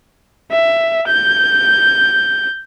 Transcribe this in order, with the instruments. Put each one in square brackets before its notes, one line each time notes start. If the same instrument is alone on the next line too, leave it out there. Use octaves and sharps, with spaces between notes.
[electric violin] E5
G6